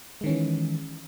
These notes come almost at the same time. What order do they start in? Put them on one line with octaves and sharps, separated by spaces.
G#3 D#3 C#4 E3